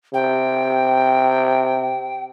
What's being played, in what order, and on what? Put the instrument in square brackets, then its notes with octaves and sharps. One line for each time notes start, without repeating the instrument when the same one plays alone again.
[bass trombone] C3 [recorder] G5